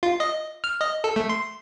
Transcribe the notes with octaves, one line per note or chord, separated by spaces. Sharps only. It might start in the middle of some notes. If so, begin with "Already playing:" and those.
F4
D#5
F6
D#5
A4
A3
C6